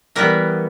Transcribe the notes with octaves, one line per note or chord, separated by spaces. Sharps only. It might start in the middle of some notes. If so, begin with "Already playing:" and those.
E3 G3 B3 A#4